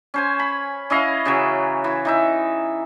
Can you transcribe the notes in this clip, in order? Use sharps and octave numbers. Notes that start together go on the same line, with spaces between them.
C#4 C5 G#5
B5
C#4 E4 D#5 F5
C#3 E3 F#3
E3
E3 D#4 E5